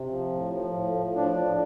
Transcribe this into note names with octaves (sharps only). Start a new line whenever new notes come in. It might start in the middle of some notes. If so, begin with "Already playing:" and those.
Already playing: C3
F3
A2
F3
A2
A2
F3 D4
F3